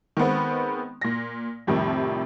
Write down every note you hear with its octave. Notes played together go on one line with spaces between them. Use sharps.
D#3 G#3 B3 C4
A#2 A#6
F2 A2 C3 D#3 F3 G3